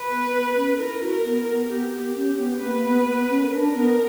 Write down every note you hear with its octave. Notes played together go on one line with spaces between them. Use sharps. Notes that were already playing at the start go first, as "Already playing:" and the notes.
Already playing: B4
B3
B3
C#4
E4 A#4
F#4
A#4
B3
A#4
B3
B3 G4
B3
C#4
B3
A#3 B4
B3
B3
C#4
D4 A#4
B3